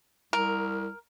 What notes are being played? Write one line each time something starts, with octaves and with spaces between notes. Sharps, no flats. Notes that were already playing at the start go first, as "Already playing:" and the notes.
C2 A#4